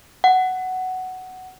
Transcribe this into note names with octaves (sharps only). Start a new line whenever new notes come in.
F#5